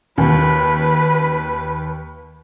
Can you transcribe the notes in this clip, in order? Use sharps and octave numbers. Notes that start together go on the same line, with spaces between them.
D#2 B4